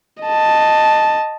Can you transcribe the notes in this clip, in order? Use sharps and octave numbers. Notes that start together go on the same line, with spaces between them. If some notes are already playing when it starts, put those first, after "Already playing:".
D#5 A5